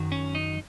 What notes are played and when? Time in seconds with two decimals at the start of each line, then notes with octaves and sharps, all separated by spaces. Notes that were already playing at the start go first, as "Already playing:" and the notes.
Already playing: F#2 D#3 F#3
0.12 C#4
0.35 D#4